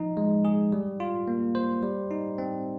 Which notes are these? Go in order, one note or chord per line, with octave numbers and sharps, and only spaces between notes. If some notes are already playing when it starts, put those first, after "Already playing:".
Already playing: F3 D#4
G#3
G#4
G3
F4
A#3
C5
G3
D#4
C4